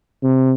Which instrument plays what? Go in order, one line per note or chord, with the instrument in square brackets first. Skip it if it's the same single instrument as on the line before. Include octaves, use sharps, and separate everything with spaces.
[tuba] C3